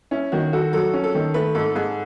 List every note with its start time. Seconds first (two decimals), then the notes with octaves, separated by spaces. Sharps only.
0.11 C#4 E4
0.32 D#3 F#4
0.53 F#4 A4
0.73 F#3 A4
0.94 C#4
1.04 A4
1.15 D#3
1.34 A3 B4
1.55 G#2 A4
1.75 G#2 G#4